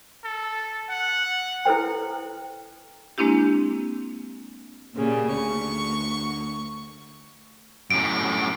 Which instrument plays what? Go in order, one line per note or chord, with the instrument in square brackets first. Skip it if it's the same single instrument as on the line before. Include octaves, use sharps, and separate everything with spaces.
[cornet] A4
F#5
[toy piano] E4 A4 B4 C5 G5
[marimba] G#3 A#3 C4 D4 E4 G4
[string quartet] A#2 C#3 G3
D2 C#6
[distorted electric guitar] F#2 A2 [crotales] D7